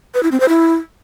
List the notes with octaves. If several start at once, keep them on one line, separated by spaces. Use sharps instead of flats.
B4
E4
C4
C5
E4